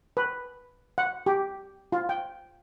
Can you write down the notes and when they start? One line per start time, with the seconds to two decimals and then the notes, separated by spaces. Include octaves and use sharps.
0.17 B4
0.98 F#5
1.26 G4
1.92 F4
2.09 G5